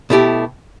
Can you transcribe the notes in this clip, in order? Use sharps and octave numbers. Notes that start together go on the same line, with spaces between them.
B2 A3 E4 G4